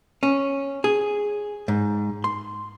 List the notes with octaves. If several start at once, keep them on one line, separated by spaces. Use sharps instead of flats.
C#4
G#4
G#2
C6